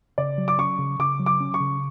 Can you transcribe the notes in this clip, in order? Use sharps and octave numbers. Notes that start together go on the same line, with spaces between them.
C#3 D5
F#3
D6
C#4 C#6
C#3
C#3 D6
F#3
D6
C#4
C#6
C#3